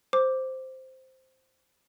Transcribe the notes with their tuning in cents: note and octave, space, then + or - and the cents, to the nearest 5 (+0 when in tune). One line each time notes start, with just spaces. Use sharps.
C5 +0 D6 +0